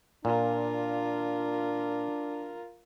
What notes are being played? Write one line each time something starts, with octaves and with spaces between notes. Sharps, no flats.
A#2 D4 F4 A#4